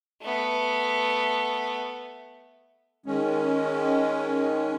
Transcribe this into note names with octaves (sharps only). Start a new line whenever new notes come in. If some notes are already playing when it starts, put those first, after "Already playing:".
A3 B3
D#3 G#3 C#4